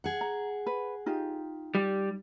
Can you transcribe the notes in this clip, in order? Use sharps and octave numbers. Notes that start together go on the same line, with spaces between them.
G#4 F#5
A#5
B4
D#4 F4 G4
G3